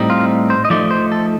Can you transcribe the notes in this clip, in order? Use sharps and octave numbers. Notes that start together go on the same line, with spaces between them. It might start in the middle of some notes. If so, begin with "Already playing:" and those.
Already playing: A2 G3 C4 D#4
F4
C5
D#5
F3 A3 D#4 D5
C5
A4